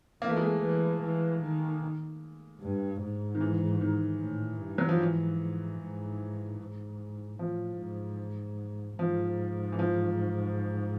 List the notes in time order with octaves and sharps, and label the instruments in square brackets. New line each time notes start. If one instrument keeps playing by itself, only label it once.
[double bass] E3 [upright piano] A#3
[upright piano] A3
G#3
A3
[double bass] E3
E3
D#3
G2
G#2
[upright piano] D#3
E3
D#3
[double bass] A2
G2
[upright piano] F#3
F3
[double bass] G#2 [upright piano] E3
[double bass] G#2
G#2
[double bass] A2 [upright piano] F3
[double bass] G#2
[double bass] G#2 [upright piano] F3
[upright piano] E3
F3